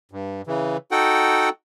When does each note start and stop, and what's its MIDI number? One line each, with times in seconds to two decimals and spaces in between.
0.11 0.42 43
0.47 0.77 49
0.47 0.77 52
0.91 1.49 63
0.91 1.49 66
0.91 1.49 69
0.91 1.49 78
0.91 1.49 79